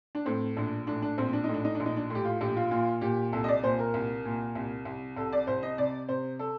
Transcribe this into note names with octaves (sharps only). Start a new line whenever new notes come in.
D4
A2 C4
A#1 D4
A2 D4
D4
A#1 C4
D4
A2 D#4
D4
D#4
D4
A#1
D#4
D4
A2 G4
F4
A#1 G4
F4
A#2 F4
A#2 G4
C2 A4
D#5
D5
A#2 C5
A#4
C2
A#2
C2
C2
C2 A4
D5
C2 C5
D#5
C3 D5
C3 C5
A4